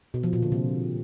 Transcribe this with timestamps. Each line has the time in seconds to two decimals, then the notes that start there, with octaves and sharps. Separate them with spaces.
0.14 B2
0.23 F3
0.33 A#2
0.42 D3
0.52 C3